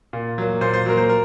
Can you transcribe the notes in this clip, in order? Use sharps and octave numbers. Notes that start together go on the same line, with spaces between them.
A#2
F#3 A#3
A#2 C5
C5
F#3 A#3 A#4
C5
A#4